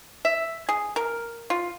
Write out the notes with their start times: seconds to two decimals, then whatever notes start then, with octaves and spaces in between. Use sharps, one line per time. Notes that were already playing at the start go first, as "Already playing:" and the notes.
0.25 E5
0.69 G#4
0.96 A#4
1.50 F4